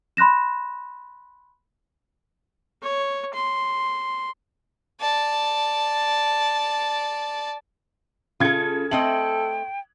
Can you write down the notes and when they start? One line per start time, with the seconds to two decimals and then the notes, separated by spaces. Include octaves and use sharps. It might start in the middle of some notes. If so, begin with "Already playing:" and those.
0.17 B5 C6 F#6 A#6 E7
2.83 C#5
3.34 C6
5.01 D5 A5
8.40 C#3 F4 A4 G#6 C#7
8.91 A3 C4 A4 D#5 G5 F#7